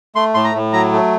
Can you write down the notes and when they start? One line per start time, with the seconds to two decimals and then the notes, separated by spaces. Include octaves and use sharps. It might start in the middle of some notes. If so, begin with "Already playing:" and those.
0.15 A3 C6
0.34 A2 C6
0.44 A#5
0.55 A2
0.73 F#3 A#5
0.93 A3